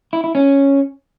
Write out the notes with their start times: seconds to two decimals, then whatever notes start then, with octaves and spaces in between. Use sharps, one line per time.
0.13 E4
0.24 E4
0.35 C#4